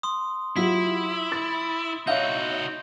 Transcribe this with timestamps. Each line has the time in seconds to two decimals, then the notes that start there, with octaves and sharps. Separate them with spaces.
0.03 C6 D#6
0.56 F#3 E4 F4 G4 B6
1.32 A6
2.07 D#4 F#4 C#5 E5 F5 G6